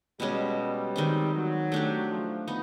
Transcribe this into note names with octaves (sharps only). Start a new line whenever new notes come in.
B2 G3 G#3 C#4
G3
D#3 G#3 C4
F#3
A3 D4 G4
F3
B3 D#4